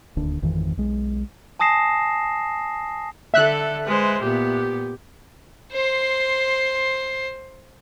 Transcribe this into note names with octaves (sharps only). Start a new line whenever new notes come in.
D#1 D2 D4
G#1 F2 D#3 E3
B1 G#3
G#5 A5 D#6 A#6 C7 E7
D3 A4 E5 F#6
G#3 B4 C5
A#2 B3 G4
C5 C6